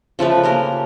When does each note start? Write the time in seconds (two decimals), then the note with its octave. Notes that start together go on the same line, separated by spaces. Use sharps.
0.19 C#3 F3 A3 B4
0.43 A#3 G4 A#4